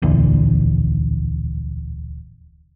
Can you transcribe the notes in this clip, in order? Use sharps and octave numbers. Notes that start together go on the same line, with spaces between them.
D1 A#1 E2 D3